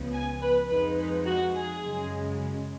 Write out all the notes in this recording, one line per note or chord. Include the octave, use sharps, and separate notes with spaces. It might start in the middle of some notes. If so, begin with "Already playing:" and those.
Already playing: C#2 C#3 F3 B3
G#5
B4
F2 F3 G#3 D#4 B4
B4
F#4
G#4
F#2 C#3 G#3